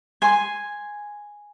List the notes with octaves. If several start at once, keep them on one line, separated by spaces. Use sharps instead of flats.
G#5 C6